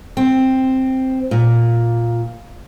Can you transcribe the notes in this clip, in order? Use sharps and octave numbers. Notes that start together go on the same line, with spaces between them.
C4
A#2